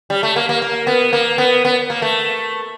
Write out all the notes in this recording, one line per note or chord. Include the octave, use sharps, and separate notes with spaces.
G3
A3
A#3
A#3
A#3
B3
A#3
B3
B3
A#3
A3